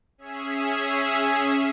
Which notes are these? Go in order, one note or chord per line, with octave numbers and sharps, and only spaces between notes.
C#4 G#4 E5